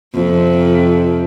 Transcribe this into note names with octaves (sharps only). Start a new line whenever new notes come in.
F2 C3